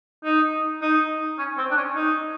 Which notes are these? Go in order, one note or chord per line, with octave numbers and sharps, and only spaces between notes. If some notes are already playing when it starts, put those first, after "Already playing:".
D#4
D#4
C#4
C4
D4
C#4
D#4